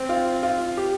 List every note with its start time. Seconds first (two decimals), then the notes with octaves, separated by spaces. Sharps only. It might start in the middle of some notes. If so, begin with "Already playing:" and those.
Already playing: C4
0.09 F4
0.43 F4
0.77 G4